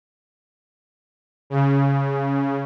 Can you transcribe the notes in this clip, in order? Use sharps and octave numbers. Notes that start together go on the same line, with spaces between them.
C#3